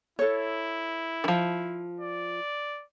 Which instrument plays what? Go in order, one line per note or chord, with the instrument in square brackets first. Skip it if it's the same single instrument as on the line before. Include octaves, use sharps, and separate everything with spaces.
[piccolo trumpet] E4 [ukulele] A4 C#5
[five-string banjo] D#3 F3
[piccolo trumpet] D5